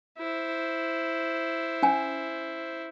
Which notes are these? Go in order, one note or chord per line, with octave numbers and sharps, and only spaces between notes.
E4 C5
C#4 G#5